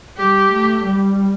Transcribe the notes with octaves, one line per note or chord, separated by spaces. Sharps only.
G3 G4
A3
G3